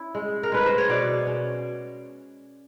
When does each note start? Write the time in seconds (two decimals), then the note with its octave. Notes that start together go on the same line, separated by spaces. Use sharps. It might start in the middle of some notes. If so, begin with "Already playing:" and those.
Already playing: C#4 E4
0.15 G#3
0.43 A#4
0.52 G#3 B4
0.66 C5
0.78 C#5
0.89 B2 D5
1.27 C#4